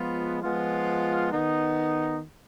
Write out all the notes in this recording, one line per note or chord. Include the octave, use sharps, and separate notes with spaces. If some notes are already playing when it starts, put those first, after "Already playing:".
Already playing: F3 G#3 B3 F4
F3 G#3 B3 F4
D#3 B3 D#4